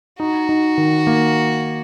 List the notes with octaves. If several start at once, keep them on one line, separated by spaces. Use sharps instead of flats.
D#4 F#4
D#4
D#3
A#3